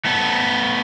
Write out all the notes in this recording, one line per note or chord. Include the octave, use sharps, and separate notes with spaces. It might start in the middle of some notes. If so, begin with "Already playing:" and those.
A3 B3